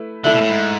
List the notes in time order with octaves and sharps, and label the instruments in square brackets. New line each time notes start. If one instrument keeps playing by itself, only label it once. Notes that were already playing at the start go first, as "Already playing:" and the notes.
Already playing: [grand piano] A3 E4 B4
[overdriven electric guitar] D3 [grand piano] A3 E4 A4 E5
[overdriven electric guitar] B2
A2
G#2